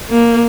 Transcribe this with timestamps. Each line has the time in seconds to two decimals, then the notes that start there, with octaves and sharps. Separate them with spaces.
0.10 A#3